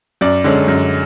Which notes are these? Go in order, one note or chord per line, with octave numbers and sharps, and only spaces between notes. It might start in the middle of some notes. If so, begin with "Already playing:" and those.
F#2 D5
D3 G#3 C#4
F#2